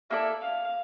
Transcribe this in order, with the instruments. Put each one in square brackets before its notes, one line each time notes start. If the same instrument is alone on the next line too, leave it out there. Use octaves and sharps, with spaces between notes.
[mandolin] A#3 E4 A4 D5 [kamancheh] E5
[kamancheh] F5